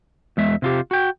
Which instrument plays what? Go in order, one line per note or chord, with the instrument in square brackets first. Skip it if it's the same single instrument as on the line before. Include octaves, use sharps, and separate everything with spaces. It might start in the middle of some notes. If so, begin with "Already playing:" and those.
[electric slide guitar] E2 G#3 E5
C3 F4 G4
F#4 G5